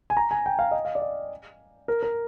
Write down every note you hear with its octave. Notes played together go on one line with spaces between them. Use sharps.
G#5
A#5
G#5
G5
F5
D#5
F5
D5
D#5
A#4
A#4